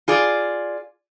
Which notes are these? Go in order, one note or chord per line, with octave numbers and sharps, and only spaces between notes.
F4 G#4 D5